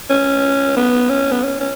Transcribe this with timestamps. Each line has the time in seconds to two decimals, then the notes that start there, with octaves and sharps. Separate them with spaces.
0.10 C#4
0.76 B3
1.09 C#4
1.32 B3
1.43 C#4
1.60 C#4